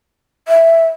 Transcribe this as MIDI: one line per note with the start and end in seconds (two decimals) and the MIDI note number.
0.48 0.86 76